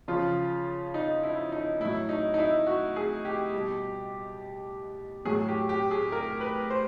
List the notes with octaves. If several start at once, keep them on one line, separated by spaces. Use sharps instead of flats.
C#3 F3 F4
D#4
E4
D#4
A2 F#3 E4
D#4
D#4
E4
F#4
G#4
G4
B2 G3
A2 F#3 G#4
G4
G4
G#4
A#4
B4
C5